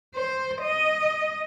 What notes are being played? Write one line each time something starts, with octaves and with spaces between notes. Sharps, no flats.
C5
D#5